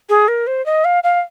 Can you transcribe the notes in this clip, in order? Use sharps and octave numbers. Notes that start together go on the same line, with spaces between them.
G#4
A#4
C5
D#5
F5
F5